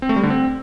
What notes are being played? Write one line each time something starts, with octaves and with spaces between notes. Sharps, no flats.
C4
A3
G3
D3
C4